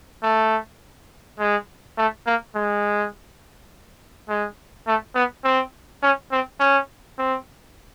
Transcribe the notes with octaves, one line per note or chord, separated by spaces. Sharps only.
A3
G#3
A3
A#3
G#3
G#3
A3
B3
C4
C#4
C4
C#4
C4